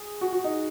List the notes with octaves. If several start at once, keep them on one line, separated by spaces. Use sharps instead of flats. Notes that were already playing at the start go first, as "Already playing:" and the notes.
Already playing: G#4
F#4
F#4
D#4